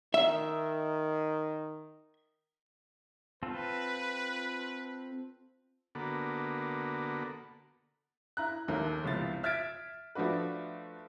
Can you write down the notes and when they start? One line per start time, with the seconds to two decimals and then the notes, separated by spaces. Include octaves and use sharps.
0.14 D#3 E5
3.43 C4 F4 A4 B4
5.95 D3 A#3 B3 F#4 A4
8.37 E4 A#5 F#6
8.68 D#1 D#2 A3 A#4
9.03 G1 C#2 C3 E3 F3 A6
9.43 E5 F6 G#6 A6 B6 D7
10.15 F3 A3 D4 F#4 B4